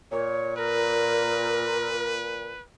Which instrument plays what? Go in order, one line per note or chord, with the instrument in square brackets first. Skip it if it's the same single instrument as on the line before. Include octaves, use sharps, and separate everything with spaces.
[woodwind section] A#2 [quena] C#5
[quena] A#4 [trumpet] B4